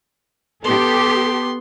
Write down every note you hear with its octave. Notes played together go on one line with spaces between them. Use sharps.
B3 G4 A4 C6